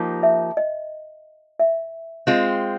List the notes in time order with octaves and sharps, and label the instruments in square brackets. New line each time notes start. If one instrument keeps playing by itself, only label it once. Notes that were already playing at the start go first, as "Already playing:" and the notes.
Already playing: [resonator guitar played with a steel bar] F3 A#3 D#4 G4
[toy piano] E5
D#5
E5
[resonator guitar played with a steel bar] G#3 C4 F4